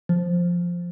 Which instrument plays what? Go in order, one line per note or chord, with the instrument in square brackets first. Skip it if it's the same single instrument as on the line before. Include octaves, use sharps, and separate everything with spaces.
[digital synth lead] F3